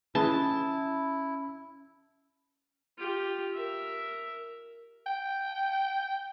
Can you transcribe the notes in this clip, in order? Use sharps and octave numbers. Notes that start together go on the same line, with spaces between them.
E3 C#4 E4 G#4 B4 A5
F4 G4
A#4 E5
G5